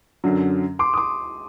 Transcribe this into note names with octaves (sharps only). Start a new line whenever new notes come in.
F#2 D3 F#3
C6 D6
D#6
C6 D6